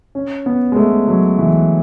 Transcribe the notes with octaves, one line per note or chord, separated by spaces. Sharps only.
C#4
B3
G#3
A3
F#3
E3